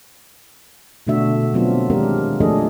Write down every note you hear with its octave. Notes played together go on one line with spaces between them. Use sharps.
B2 D3 A3 D4 F#4 E5
F#3 G3 B3 C4 D4 F4
D#3 G#3 A#3 D4 G4 A#4
F3 A3 D4 G#4 A4 D#5